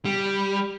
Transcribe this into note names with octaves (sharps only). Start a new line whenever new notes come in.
G3